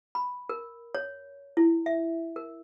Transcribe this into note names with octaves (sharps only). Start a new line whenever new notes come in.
B5
A#4
C#5
E4
E5
A#4